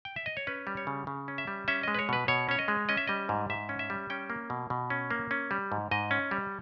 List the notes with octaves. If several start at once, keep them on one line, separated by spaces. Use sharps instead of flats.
G5
E5
D#5
C#5
C#4 B4
G3
C#5
C#3
C#3
C#4
E5
G3
C#4 E5
G#3 D#5
B4
C#5
B2 B4
B2 C#5
C#4 C#5
D#5
G#3
C#4 D#5
E5
G3 D#5
G#2
G#2 E5
C#4
E5
G3
C#4 G5
A#3
B2
B2
C#4
A#3
C#4
G3
G#2
G#2 D#5
C#4
G3